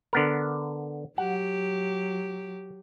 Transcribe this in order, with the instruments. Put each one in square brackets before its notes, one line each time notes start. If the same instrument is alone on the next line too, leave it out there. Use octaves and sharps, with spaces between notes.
[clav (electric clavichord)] D3 B3 A#4
[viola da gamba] F#3 G4 [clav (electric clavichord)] F#5